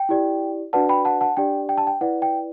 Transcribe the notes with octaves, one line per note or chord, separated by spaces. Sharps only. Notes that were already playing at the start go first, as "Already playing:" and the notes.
Already playing: G5
E4 G4 D5
D4 F#4 B4 D5 F#5 A5
G5 B5
F#5 A5
F#5 A5
D4 G4 D5 G5
G5
A5
G5
E4 B4 D5 F#5
G5